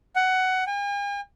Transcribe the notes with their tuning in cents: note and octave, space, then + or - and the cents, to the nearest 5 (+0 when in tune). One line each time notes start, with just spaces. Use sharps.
F#5 +15
G#5 -45